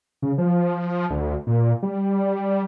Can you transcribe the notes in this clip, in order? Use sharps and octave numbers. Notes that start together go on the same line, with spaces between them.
C#3
F3
D2
A#2
G3